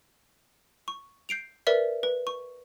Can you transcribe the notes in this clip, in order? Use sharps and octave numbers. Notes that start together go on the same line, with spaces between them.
C#6
G6 C7 D7 F7
A#4 B4 D5 E5
B4
C#6